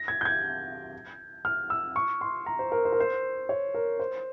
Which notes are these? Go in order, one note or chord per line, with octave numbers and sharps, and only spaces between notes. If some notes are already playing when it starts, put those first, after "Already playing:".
Already playing: A#6
G#6
G6
G#6
F6
E6
C#6
C6
A#5
C5
A#4
C5
A#4
C5
C#5
A#4
C5